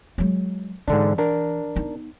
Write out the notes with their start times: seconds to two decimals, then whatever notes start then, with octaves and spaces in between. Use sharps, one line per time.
0.18 F#3 G#3
0.88 G#2 D3 E3 D4
1.18 D4 A#4
1.76 B3 D#4